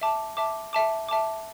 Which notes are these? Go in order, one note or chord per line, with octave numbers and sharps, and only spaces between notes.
E5 A5 D6
E5 A5 D6
E5 A5 D6
E5 A5 D6